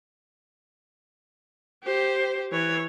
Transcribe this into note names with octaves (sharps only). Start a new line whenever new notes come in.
G4 C5
E3 C#5